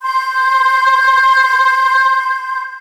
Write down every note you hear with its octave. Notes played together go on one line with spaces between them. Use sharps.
C6 G6